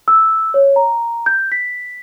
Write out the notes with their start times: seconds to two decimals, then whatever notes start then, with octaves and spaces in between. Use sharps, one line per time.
0.08 E6
0.54 C#5
0.76 A#5
1.26 G6
1.52 B6